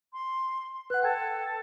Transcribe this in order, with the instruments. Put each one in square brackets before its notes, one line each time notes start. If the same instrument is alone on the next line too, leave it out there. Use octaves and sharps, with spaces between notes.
[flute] C6
[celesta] B4 F#5 [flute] F#6
[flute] A4 [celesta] G5 G#6